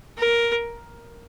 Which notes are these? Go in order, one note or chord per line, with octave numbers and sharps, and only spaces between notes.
A#4